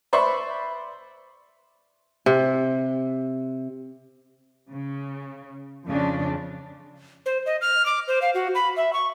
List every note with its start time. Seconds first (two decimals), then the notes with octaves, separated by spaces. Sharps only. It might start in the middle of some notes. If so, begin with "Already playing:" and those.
0.13 B4 C5 D5 E5 B5 C#6
2.26 C3
4.70 C#3
5.86 F2 C#3 D4
7.26 C5
7.46 D#5
7.61 F6
7.86 D6
8.08 C5
8.22 F5
8.34 F#4
8.55 B5
8.77 E5
8.93 C#6